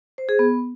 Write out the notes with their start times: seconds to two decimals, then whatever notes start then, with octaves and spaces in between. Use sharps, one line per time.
0.18 C5
0.29 G#4
0.39 B3